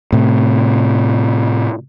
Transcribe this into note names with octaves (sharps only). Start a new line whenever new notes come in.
A2 C3